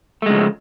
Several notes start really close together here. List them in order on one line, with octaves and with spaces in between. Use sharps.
A3 G#3 C#3 F3